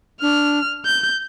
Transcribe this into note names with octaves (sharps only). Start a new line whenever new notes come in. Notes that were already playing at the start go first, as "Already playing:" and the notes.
D4 F6
G6